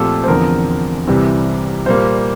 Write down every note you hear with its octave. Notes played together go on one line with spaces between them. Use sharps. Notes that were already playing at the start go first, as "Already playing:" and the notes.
Already playing: A#2 F3 A3 C4 F4 G4 A4
C5
E2 D3 F3 C4 A#4
C2 C3 E3 G3 C4
A#2 G3 A#3 C5